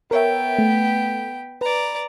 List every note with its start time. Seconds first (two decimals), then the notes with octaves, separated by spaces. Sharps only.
0.11 B3 A#4 C#5 E5 G5
0.59 A3
1.61 B4 D5 A#5